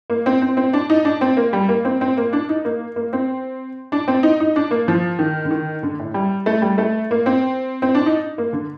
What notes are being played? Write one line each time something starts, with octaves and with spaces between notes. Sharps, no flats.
A#3
C4
C4
C4
D4
D#4
D4
C4
A#3
G3
A#3
C4
C4
A#3
D4
D#4
A#3
A#3
C4
D4
C4
D#4
D#4
D4
A#3
F3
D#3
D3
D#3
D3
A2
G3
A3
G3
A3
A#3
C4
C4
D4
D#4
A#3
D3